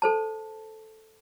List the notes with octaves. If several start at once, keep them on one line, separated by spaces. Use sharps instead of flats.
A4 C5 A5